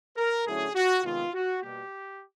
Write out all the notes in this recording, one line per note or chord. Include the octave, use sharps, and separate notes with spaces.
A#4
D3 F#3 A3 C#4 E4 G#4
F#4
C3 D#3 G#3 B3 F4
F#4
B2 G3 A#3 G4